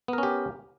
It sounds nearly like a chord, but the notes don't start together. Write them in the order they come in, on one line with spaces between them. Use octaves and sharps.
B3 A#4 C#4 G4